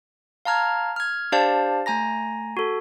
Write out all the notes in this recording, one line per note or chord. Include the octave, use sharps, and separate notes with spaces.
F5 A5 A#5 F6 G#6
F6 G#6
D4 G4 C5 D5 F5 A5
A3 G#5 A#5 A#6
F#4 A4